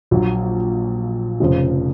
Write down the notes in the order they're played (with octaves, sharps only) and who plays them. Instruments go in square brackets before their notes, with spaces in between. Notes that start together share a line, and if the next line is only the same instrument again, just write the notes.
[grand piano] A#1 A#2 F#3
F1 F2 C#3 F3